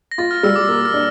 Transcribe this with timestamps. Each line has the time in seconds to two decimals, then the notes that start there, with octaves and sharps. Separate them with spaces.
0.12 A#6
0.18 F4 A6
0.31 F6
0.43 G3 E6
0.56 D6
0.69 A#3 E6
0.85 F6
0.94 D4